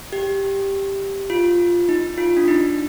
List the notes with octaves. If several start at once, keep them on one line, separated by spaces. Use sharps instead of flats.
G4
F4
D#4
F4
D4
D#4